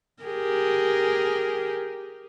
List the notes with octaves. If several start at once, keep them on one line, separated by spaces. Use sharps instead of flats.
G4 G#4 A#4